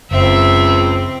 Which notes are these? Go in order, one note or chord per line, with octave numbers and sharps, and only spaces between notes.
F#1 C#2 C4 E5